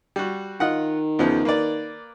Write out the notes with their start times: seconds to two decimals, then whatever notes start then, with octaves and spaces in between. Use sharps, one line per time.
0.16 G3 F#4
0.60 D#3 F4 D#5 F#5
1.19 E2 C#3 F3
1.45 A#3 B4 D5